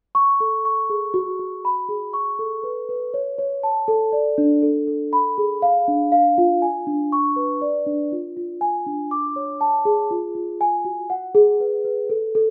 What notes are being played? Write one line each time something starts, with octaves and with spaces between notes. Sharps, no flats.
C#6
A4
C#6
G#4
F#4
F#4
B5
G#4
C#6
A4
B4
B4
C#5
C#5
A5
A4
D5
D4
A4
A4
B5
G#4
F5
D4
F5
F4
G#5
D4
C#6
B4
D5
D4
F4
F4
G#5
D4
D6
C#5
A5
G#4
F4
F4
G#5
F#4
F#5
G#4
B4
B4
A4
A4